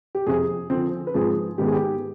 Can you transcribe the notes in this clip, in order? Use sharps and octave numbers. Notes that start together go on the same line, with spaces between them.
G4
F2 C3 F3 G#4
D3 F3 C4
B4
G#2 F3 C4 G#4
G#2 D#3 B3 G4
G#4
G4